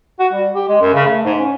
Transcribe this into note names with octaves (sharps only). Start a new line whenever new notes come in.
F#4
G3
G4
G#3
F#2
C#3
A3
G#2
C#4